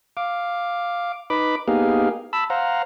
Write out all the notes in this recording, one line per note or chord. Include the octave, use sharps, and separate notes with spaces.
F5 D6
D#4 B4 B5 D6
A#3 B3 D#4 G4 G#4 F5
A5 B5 E6
C5 F5 F#5 A#5